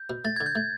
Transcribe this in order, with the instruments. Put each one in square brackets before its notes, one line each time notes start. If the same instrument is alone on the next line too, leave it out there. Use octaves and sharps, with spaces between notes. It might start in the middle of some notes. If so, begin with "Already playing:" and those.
Already playing: [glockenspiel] G6
[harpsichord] B2
[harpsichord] A3 [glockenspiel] A6
[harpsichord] D3 [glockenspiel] G#6
[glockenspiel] G6
[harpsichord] A3 [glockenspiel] G#6